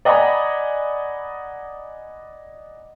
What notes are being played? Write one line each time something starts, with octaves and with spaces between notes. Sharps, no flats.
D5 D#5 F#5 G#5 A#5 B5